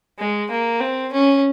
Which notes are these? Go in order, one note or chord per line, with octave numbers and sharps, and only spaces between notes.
G#3
A#3
C4
C#4